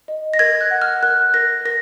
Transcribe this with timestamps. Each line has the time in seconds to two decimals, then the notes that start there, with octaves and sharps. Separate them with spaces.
0.08 D#5
0.34 A#6
0.39 A#4 G#6
0.61 F#6
0.71 F#5
0.82 F6
1.03 A#4 F#6
1.34 A#4 A#6
1.65 A#4 A#6